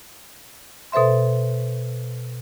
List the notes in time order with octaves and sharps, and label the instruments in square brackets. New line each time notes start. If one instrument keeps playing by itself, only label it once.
[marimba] B2 A4 C5 E5 C6